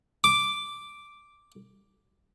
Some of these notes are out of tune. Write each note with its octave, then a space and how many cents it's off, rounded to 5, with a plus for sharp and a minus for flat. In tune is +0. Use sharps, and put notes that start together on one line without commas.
D6 +0